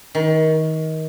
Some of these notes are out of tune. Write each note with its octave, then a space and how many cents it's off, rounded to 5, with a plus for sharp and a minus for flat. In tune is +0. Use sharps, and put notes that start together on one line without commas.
D#3 +25